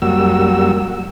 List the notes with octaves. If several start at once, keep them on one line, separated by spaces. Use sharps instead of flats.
F#2 G3 A#3 F#4 E6